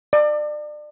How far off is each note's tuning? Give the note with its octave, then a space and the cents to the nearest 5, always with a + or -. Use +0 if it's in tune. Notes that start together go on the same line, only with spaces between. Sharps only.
D5 +30